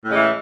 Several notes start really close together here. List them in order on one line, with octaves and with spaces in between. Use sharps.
A2 C#3 G#3 E3